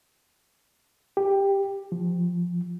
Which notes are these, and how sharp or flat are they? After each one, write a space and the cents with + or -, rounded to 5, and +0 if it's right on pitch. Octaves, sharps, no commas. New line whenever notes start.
G4 +10
F3 +5